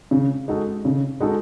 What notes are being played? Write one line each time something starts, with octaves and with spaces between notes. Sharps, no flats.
C#3
G#3 D#4 F#4 A4
C#3
G#3 D#4 F#4 A4